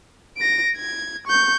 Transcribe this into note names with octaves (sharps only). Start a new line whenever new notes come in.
A#6 D7
G#6
C#6 G6